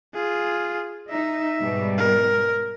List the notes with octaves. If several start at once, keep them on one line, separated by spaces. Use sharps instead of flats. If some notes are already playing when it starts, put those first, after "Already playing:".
F4 G#4
D#4 E5
G#2 B2 G3
A#4